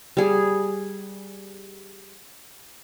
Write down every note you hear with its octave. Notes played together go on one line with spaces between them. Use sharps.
G3 G#4